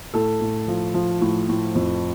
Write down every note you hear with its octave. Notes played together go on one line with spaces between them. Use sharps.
A2 A4
A2
F3
F3
A2
A2
F2